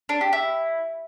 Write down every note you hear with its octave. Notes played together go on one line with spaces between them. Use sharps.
D4
G4
E4